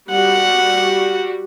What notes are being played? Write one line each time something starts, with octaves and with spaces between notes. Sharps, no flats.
G3 F#4 F#5